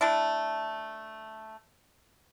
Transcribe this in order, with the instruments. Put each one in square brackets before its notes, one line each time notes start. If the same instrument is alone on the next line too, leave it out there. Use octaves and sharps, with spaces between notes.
[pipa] A3 D4 E4